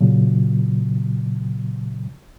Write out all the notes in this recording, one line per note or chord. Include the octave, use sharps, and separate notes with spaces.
A#2 C#3 F#3